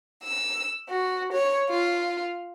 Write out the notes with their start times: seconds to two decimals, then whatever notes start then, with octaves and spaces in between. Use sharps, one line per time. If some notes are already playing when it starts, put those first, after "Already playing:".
0.24 E6
0.89 F#4
1.34 C#5
1.70 F4